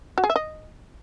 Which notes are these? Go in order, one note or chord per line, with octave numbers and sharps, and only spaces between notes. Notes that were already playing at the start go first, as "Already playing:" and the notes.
F#4
G#4
E5
D#5